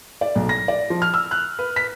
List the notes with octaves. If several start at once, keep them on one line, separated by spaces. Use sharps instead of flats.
D5
B1
A#6
D5
F3
F6
E6
F#6
B4
B6